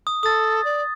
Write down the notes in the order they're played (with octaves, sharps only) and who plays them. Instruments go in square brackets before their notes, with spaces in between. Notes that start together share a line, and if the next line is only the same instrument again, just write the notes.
[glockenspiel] D#6
[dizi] A4 [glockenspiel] D#6 A6
[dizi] D5